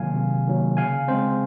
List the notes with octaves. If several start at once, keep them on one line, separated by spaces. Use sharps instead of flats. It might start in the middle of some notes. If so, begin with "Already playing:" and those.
Already playing: C3 D#3 F#3 A#3 F5 G#5
C3
D#3 F#3 A#3
C#3 F5 G#5
G#3 C4 C5